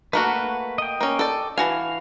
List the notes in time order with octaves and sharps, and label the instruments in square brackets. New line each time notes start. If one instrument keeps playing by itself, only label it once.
[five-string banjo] A3 A#3 F#4 [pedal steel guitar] B4 F#5
[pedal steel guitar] D#5 G5
[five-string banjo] A#3 C#4
A4 D5
[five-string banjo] E3 F#4 G#5 [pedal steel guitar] F5